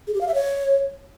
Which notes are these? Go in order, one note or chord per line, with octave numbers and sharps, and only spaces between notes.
G#4
G4
F5
E5
C#5